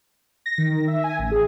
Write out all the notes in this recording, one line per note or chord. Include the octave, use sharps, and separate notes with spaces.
A#6
D#3
E5
G#5
A1
G#4